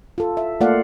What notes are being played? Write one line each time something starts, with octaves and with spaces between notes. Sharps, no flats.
F4 A4
E5
A3 A#3 F4 D5 F5 F#5